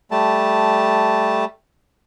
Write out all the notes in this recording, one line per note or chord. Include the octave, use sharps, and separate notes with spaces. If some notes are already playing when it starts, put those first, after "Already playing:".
G3 A3 A5